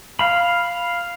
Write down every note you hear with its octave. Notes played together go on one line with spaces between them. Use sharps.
F5 B5